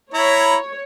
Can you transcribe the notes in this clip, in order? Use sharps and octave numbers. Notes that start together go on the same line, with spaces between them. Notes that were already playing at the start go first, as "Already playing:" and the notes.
E4 C#5 A#5 B5